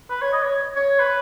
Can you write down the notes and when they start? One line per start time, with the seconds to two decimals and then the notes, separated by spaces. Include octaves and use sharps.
0.10 B4
0.22 C#5
0.33 D#5
0.43 C#5
0.76 C#5
1.00 B4